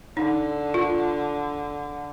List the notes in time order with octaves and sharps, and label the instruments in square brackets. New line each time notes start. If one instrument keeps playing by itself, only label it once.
[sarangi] D3 [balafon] D#4
[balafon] F4